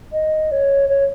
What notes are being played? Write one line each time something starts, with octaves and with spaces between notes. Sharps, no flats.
D#5
C#5
C#5